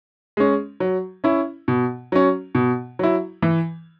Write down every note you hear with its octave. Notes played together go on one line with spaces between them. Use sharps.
G#3 C#4
F#3
C#4 E4
B2
F#3 C#4
B2
F#3 E4
E3